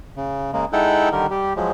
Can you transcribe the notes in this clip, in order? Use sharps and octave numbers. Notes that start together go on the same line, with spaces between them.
C#3
C#3 G#3 A#3
G#3 D#4 E4 A4 F#5 G5
D3 D#3 G3 A#4
G3 G4
F3 F#3 G#3